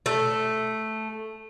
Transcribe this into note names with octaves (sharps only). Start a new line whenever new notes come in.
A3